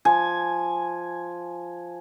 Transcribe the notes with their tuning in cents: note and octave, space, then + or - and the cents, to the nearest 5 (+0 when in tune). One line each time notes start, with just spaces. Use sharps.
F3 +0 G#5 +0